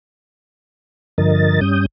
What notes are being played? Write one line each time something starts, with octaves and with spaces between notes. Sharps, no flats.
G2 D3 F3 A#4 D#5 A6
G2 G3 C#4 D#6 G6